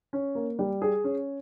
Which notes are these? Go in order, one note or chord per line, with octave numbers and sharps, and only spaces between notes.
C#4
A#3
G3
G#4
C#4